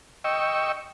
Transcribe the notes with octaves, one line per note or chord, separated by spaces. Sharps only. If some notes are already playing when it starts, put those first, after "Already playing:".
D#5 G5 C#6 E6